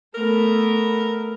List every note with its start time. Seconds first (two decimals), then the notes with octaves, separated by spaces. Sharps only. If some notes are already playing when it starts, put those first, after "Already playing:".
0.14 A3 B3 A#4